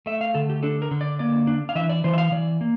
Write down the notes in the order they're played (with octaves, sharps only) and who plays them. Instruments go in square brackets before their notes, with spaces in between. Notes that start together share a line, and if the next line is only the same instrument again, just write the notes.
[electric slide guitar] A3 E5
F5
D3 A4
G4
D4 A4
A#4
D3
D5
A#3 D5
D4
F5
E3 E5
D5
E3 C5
E5
F5
E3 D5
A#3